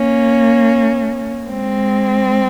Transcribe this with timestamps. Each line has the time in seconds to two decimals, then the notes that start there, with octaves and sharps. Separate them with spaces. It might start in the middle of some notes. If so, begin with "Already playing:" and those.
Already playing: A#3 C#4
1.51 G#3 C4